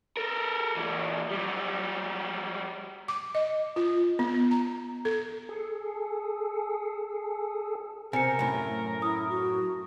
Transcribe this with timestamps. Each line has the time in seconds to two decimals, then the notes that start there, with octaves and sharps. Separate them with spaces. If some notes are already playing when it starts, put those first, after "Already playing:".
0.17 A4 A#4
0.76 A#2 E3
1.31 F#3 G3
3.08 D6
3.35 D#5
3.76 F4
4.19 B3
4.51 A#5
5.05 A4
5.49 G#4 A4
8.13 C3 A#4 C5 G#5 C#7
8.39 F#2 A2 A3
9.02 E4 D#6
9.29 F#4